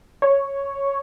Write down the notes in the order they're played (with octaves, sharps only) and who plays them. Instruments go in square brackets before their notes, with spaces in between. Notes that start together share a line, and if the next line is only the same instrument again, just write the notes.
[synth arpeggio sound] C#5